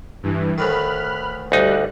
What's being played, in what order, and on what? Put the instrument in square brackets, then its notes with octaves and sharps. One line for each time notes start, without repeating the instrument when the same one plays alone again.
[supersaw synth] G2 E3
[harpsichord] D2 A2 D#3 [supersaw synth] B5 F6 F#6
[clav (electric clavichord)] D2 D#4 [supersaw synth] G3 F#6